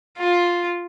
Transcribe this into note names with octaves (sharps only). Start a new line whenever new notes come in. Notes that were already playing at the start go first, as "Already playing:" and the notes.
F4